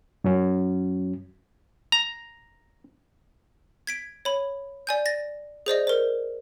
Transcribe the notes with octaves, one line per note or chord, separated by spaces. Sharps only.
F#2 F#3 C#4
A#5
G#6 B6 D7
C#5 B5
D5 G#5 G6
A6 A#6
G#4 C5 D5 D#5
A#4 C5